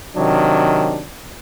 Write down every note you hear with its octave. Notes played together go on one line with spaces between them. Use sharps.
C3 D#3 F#3 D4